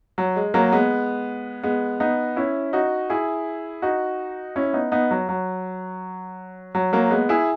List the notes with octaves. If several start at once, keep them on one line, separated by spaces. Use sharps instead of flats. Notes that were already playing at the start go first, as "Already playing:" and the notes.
F#3
G#3
F#3 A#3
G#3 B3
G#3 B3
B3 D#4
C#4 E4
D#4 F#4
E4 G#4
D#4 F#4
C#4 E4
B3 D#4
B3 D#4
F#3
F#3
F#3
F#3 A#3
G#3 B3
E4 G#4